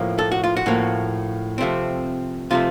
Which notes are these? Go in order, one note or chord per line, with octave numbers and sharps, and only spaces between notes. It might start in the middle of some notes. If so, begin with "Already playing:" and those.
Already playing: A2 F3 A#3
A4
F#4
F4
F#4
A2 F3 A#3
C3 F3 A3 C4
C3 F3 A3 F4